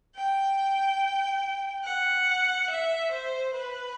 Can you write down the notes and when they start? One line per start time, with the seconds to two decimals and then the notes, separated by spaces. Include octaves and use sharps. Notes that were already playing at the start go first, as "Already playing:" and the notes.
0.16 G5
1.84 F#5
2.69 E5
3.11 C5
3.54 B4